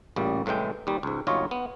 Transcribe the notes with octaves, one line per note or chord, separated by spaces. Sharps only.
A1 A#2 C#3 G3
C2 A2 E3 G#3 G5
D#2 G3
C#2 G#2
G1 D#2 F#3 F4 C#5 D#5
B3